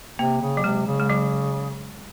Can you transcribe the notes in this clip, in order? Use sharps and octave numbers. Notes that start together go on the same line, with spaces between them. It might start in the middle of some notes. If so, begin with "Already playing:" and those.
C3 A#3
C#3
F#3
C3 G#3
C#3
G#3
F#3